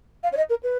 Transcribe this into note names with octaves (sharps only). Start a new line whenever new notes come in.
F5
C#5
D#5
A#4
B4